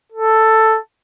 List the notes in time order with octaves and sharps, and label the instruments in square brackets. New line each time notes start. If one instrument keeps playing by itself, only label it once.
[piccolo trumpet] A4